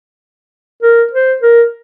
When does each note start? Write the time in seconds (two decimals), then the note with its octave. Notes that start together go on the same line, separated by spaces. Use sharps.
0.83 A#4
1.13 C5
1.42 A#4